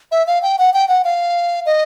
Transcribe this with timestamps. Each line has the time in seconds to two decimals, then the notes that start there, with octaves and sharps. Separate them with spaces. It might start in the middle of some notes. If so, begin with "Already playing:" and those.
0.12 E5
0.27 F5
0.42 G5
0.59 F#5
0.74 G5
0.88 F#5
1.04 F5
1.66 D#5